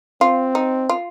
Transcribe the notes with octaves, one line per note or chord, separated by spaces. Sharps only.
C4 F4
D#4
F4